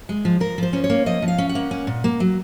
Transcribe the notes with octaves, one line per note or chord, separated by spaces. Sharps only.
G#3
F3
F3 A#4
F3 C5
C#4
C#5
A#3
F3 D#5
F3
F5
C#4
F#5
A#3
C#4
A#2
A#3
F#3